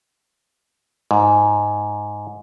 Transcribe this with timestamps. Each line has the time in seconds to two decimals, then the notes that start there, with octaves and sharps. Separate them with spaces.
1.11 G#2